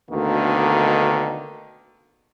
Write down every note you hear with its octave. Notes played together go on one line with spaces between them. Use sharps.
D2 B2 D3 D#3 A#3